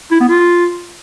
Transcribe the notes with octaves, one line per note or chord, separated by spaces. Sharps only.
E4
B3
F4